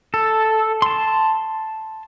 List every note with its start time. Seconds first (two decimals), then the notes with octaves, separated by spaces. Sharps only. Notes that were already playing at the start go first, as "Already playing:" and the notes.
0.14 A4
0.82 A5 C6